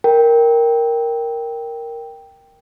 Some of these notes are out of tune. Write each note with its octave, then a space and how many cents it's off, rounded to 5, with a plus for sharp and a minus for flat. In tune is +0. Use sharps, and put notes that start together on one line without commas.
A#4 +0 G5 +0